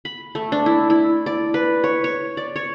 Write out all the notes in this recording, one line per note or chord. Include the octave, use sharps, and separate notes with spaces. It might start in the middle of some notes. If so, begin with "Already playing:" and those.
B5
A3
D4
E4
E4
D5
B4
C#5
C#5
D5
C#5